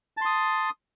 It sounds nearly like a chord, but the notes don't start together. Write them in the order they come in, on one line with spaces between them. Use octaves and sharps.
A5 C6 D#6